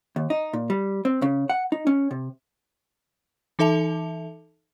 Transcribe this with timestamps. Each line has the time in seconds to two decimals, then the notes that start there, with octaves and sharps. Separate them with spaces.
0.16 D#2
0.30 D#4
0.53 A#2
0.70 G3
1.05 C4
1.22 C#3
1.50 F#5
1.72 D#4
1.87 C#4
2.11 C3
3.59 E3 D#4 A4 E5 A5 F7